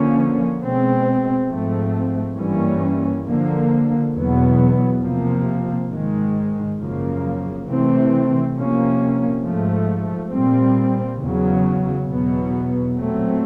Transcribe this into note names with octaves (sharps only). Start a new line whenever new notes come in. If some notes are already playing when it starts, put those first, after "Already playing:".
Already playing: D3 F3 A#3 C#4
B2 G#3 C4
G#2 F3 A3 C4
G2 E3 G3 A#3 C#4
D3 F3 A#3
E2 B2 F#3 B3
C3 F3 A#3
G#2 D#3 G#3
F#2 C#3 F3 A#3
C3 E3 A3 C4
C3 F3 A#3 C#4
G#2 F3 A3
A#2 G3 C4
E2 C#3 F#3
E2 B2 F#3 B3
A#2 F#3 A3 C4